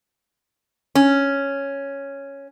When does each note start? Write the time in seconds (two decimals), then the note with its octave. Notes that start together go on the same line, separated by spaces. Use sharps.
0.95 C#4